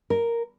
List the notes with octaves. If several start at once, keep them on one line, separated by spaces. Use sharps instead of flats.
A#4